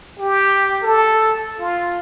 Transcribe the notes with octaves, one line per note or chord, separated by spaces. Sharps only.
G4
A4
F4